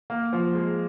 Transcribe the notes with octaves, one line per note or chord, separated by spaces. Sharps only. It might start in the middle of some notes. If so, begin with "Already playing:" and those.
A#3
F3
G#3